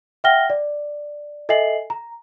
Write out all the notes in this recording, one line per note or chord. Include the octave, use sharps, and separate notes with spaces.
E5 F#5 G5 F6 A#6 G7
D5
A4 D#5 E5 G#5 C7 F#7
A#5